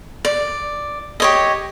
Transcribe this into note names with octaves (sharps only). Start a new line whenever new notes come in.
D5
G4 C#5 D#5